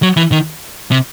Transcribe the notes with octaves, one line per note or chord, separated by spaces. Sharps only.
F#3
E3
D#3
C3